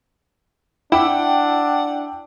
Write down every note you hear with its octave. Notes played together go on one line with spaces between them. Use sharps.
D4 E4 F#5 G5 D6 E6